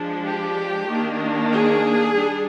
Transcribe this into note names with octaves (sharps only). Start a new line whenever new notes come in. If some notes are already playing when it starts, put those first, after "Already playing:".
Already playing: F3 G#3 D4
G4
D#3 A#3 D4
G#4
G3 D4